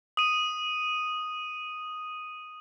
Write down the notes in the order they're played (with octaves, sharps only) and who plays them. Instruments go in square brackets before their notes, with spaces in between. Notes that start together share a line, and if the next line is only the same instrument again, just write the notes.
[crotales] D#6 D#7